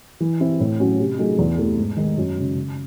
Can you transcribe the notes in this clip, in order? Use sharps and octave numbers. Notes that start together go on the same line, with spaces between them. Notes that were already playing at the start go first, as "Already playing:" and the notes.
E3
C4 E4
A2
F#3 C#4 F#4
C3
F#3 A3 D#4 G#4
E2
C3 E3 A3
G#2
D#3 G#3 D#4
F#2
C#3 G#3
C#3